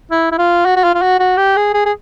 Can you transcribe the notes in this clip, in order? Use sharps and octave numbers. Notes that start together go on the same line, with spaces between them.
E4
E4
F4
F#4
F#4
F4
F4
F#4
F#4
G4
G#4
G#4
G#4